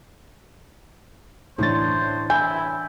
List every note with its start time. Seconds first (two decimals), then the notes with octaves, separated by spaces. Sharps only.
1.59 A2 E3 D4 C5 C#5 A6
2.30 E4 G#5 G6